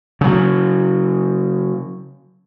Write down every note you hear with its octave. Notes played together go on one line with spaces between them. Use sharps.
C#3 F#3